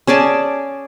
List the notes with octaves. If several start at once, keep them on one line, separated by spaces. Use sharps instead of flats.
C#4 G#4 D5 A5